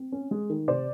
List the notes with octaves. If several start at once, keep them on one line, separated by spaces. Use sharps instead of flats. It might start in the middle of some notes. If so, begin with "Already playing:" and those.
Already playing: C4
C#4
G#3
D#3
C3 C5 D5